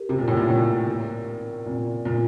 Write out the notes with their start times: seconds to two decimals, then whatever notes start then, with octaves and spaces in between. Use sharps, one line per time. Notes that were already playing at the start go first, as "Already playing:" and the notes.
Already playing: G4 A#4
0.09 C3 D5
0.19 A#2
0.28 A2
0.37 A#2
0.49 A2 C4
0.88 A#4
1.27 D#4
1.66 A#2 C4
2.05 A#2 C4